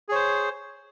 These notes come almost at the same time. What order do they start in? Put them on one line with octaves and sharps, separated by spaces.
G#4 C#5 C5